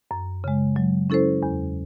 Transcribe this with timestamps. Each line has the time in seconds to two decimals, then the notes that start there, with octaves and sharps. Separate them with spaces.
0.11 F#2
0.44 C#3 G#3
0.76 F#3
1.10 C#4 E4 A4 C5
1.43 E2